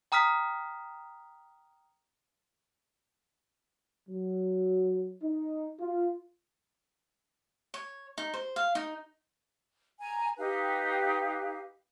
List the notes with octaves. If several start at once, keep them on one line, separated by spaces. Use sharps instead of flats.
G5 A#5 D#6 F6 B6
F#3
D#4
F4
C#5
D#4
C5
F5
D#4
G#5 A#5
D#4 G4 B4 F5